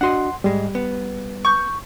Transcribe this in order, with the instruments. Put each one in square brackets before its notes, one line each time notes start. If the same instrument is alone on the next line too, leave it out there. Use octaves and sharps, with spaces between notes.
[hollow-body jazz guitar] D4 F#4 D#5 [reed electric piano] F#5 C6
[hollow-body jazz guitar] G#2 G#3 [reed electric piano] G3
[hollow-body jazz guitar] B3
[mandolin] C#6 G6